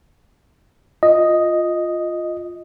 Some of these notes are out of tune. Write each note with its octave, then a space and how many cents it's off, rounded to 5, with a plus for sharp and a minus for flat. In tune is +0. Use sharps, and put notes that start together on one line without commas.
F4 +5 D#5 +0